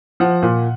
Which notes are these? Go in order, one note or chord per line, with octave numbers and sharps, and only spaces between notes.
F3 F#5
A#2